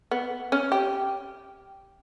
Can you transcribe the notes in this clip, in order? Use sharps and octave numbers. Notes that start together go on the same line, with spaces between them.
B3
C#4
G4